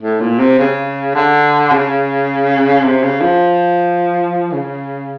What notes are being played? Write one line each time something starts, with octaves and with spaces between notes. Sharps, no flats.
A2
A#2
C3
C#3
D3
C#3
C3
C#3
F3
C#3